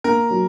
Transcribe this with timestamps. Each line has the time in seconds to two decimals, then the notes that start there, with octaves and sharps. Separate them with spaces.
0.04 A#3 A#4
0.30 F#3